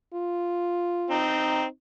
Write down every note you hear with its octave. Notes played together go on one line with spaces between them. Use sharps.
F4
C4 D#4